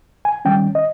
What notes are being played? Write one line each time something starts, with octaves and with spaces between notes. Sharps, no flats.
G#5
D#3 G3 C#4 G5
D#5